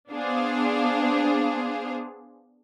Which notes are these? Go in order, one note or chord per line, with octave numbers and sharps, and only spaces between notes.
B3 D4 G#4 C5 F5